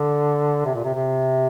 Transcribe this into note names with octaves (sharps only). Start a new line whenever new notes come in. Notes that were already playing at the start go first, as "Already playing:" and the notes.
Already playing: D3
C3
A#2
C3
C3